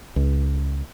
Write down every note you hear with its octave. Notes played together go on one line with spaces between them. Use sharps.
C#2